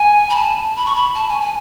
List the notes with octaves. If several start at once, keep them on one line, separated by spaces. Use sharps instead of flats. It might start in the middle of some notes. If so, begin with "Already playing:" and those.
Already playing: G#5
B5
A5
B5
C#6
B5
A5
G#5
G#5